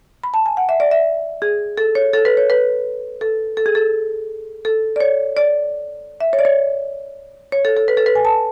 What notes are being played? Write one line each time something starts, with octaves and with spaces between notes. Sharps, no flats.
B5
A5
G#5
F#5
E5
D5
E5
G#4
A4
C#5
A4
B4
C#5
B4
A4
A4
G#4
A4
A4
D5
C#5
D5
E5
C#5
D5
C#5
C#5
A4
A4
B4
A4
B4
G#5
A5